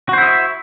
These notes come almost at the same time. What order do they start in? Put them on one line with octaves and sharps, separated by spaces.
F#4 C5 E4 D#5 E5